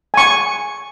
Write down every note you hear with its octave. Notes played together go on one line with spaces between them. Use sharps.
G#5 C#6